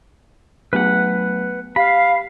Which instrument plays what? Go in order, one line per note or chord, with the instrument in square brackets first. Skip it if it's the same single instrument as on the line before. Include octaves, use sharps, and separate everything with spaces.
[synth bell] F#3 A3 B3 [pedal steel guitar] B4 F#5
[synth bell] G4 [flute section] F5 [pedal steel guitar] B5